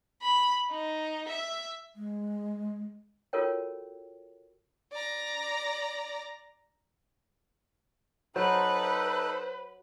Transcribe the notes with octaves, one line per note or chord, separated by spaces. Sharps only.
B5
D#4
E5
G#3
F4 F#4 A4 A#4 C#5 G5
D5 A#5
F#3 D#4 A4 B4 C5 F#6